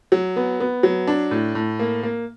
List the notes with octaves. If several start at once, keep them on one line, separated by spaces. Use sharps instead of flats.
F#3
B3
B3
F#3
D4
A2
A2
A#3
A#3